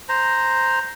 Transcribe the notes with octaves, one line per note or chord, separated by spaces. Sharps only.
C5 A#5